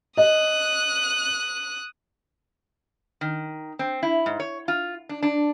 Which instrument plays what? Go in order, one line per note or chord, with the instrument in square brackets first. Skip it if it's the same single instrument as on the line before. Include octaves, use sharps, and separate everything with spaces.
[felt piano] D#5 [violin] D#6 F#6
[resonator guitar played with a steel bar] D#3
C4
E4
G#2
C#5
F4
D4
D4